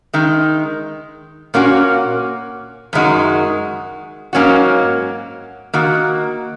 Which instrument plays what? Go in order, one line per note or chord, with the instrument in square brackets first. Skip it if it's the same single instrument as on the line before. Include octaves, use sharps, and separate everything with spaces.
[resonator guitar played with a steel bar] D#3 G#3 D#4
A#2 A#3 C#4 F#4
F#2 D#3 G#3 D#4 F#4
G#2 F#3 A#3 C#4 F#4
D#3 A#3 F#4